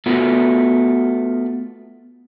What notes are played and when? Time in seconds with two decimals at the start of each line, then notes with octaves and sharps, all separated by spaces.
0.06 A3 B3 F4 F#4